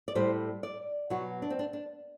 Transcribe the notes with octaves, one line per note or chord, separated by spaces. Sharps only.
D5
A2 G3 C5
D5
B2 F#3 F#4
D4
C4
D4
D4